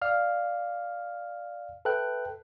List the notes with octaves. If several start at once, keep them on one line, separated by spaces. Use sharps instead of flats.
D5 F5 F6
A4 B4 E5 G5 F#6